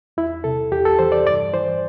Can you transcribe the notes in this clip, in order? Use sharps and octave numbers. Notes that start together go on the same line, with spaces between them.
E2 E4
C3 A4
E2 G4
A4
E3 C5
D5
G2 D5
E3 C5